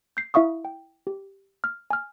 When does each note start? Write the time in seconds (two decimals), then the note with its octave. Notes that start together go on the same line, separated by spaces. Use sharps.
0.17 G6 C7
0.34 E4 E5 F5 C#6 D#6
0.65 G5
1.07 G4
1.64 F6
1.91 G#5 F6